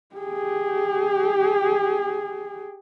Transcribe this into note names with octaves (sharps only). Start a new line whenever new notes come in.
G4 G#4